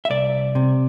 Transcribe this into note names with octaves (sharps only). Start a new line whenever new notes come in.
E5
C2 D5
C3